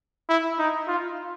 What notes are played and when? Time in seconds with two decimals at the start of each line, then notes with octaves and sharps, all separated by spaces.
0.29 E4
0.59 D#4
0.88 F4